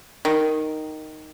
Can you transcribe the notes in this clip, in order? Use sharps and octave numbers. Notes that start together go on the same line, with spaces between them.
D#3